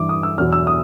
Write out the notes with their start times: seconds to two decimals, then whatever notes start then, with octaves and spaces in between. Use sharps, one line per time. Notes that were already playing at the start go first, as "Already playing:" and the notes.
Already playing: G2 E3 D6
0.09 D#6
0.23 E6
0.38 E2 B2 F#3 F6
0.52 E6
0.67 D#6